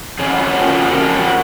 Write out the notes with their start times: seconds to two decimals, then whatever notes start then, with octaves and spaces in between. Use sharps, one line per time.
0.19 F2 C#3 G#4
0.27 F#4
0.35 F4
0.43 F#4
0.56 F2 C#3 F3 A#3
0.93 F2 C#3 F3 A#3
1.18 F#4